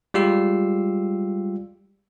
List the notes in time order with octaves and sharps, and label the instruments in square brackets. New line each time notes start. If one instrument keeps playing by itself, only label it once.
[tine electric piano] G3 G#3 F4 G4 E6 C7